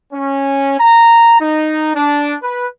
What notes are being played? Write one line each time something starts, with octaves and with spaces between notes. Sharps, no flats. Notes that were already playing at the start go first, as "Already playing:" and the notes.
C#4
A#5
D#4
D4
B4